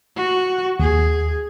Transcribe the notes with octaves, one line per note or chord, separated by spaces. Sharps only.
F#4
D#2 G#4